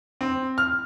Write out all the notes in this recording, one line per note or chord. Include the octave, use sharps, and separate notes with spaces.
C4
F6